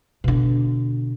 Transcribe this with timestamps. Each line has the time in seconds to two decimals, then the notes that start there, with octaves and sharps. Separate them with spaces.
0.24 B2 D3